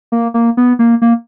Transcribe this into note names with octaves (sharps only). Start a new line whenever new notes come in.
A#3
A#3
B3
A#3
A#3